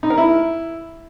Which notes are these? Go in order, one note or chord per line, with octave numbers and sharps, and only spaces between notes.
D#4
A#4
E4